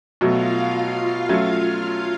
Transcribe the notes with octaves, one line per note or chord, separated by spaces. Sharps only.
B2 F#3 A3 F4 F5
F4 F5
F#3 A3 C#4 F4